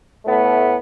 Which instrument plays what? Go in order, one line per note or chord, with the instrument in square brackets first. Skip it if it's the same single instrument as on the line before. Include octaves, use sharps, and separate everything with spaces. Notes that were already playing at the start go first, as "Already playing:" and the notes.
[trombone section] A2 A3 B3